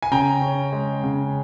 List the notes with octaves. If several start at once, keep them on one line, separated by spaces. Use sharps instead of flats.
G#5
C#3 G5 A#5
C#4
G#3
C#3